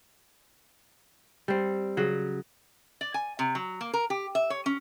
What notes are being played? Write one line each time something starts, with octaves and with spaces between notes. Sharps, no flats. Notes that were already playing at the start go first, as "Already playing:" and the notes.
G3 C4
C#3 F#3
D5
G#5
C3
F#3
A#3
A#4
G4
E5
C#5
C#4